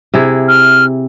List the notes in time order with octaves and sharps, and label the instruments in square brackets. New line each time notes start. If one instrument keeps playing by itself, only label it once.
[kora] C3 E4 G#4
[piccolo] F6